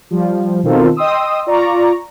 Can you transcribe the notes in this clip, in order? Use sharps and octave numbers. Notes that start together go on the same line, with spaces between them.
F3 G3
B2 D#3 C4 F4 A4 A#4
D#5 G5 C6 D#6 E6
F4 D5 A#5 C#6